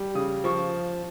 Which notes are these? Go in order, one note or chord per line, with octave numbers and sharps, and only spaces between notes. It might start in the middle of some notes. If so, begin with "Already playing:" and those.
Already playing: G3
C#3 D#6
F3 C#6